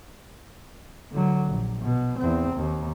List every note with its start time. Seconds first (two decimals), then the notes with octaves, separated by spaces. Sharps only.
1.12 D3 F#3
1.49 A#1
1.82 B2
2.18 E2 C4
2.56 D#2